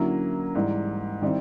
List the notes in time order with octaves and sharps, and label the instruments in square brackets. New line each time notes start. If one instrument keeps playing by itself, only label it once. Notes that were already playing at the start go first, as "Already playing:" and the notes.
Already playing: [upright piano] D3 F#3 A#3 C#4 E4
G#2 E3 G3
D#3 G3 C4 E4